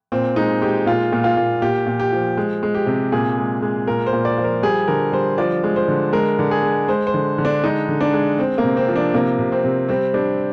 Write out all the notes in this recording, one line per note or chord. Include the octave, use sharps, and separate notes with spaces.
A#2 C4
G#3 D#4
G#3 G4
A#2 F4
A#2
F4
A#2
A#2 G4
A#2
G4
F3
G#3
G#3
G4
C3
A#2 G#4
G#3
G#3
A#2 A#4
C5
A#2
D5
F3
A#4
G3 G#4
D3 A#4
G3 C5
F3 D5
G#3
C5
D3
G#3 A#4
D3
G#4
G#3
G#3 C5
C5
D3
D3
D4
G#3 D#4
D3
D4
G#3
G#3 C4
A#3
C3
C4
F3
D4
C3 A#3
C3
C4
C3
G3 C4
G3 D4